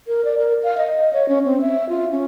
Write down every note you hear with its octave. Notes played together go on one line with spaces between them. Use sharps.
A#4
D5
A#4
F5
D#5
C#5
C#4
C4
E5
F4
C#4